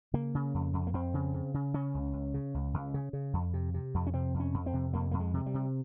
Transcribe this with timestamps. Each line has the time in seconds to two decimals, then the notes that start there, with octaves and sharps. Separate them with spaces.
0.14 C#3 A#3
0.35 C#3
0.54 F2
0.74 F2
0.87 A#3
0.93 F2 C4
1.14 C#3
1.34 C#3
1.54 C#3
1.74 C#3 C#4
1.94 C#2
2.13 C#2
2.34 C#3
2.54 C#2
2.74 C#2
2.94 C#3
3.13 C#3
3.33 F2
3.54 C3
3.74 C3
3.94 F2
4.07 C#4
4.13 C3 C4
4.34 F2
4.40 C#4
4.54 F2
4.66 C4
4.73 C3
4.93 F2 A#3
5.11 F2 A#3
5.20 G#3
5.34 C3 G#3
5.46 G3
5.54 C3